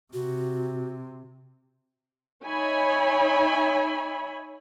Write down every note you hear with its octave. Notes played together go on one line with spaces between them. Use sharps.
C3 F#4
D#4 C#5 E5 G#5 B5